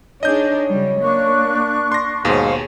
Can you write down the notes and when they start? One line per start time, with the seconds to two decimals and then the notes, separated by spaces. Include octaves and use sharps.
0.23 D4 D#4 G#4 C#5 D#5 G6
0.69 C#3 F#3 G3
1.01 A#3 D4 C#6 F#6
1.92 C6 A#6
2.25 D#2 G#2 B2 G#4 C5 C#5 F5